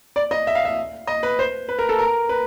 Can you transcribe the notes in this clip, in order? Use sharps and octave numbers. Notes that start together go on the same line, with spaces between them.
D5
D#5
E5
F5
E5
D#5
B4
C5
B4
A#4
A4
A#4
B4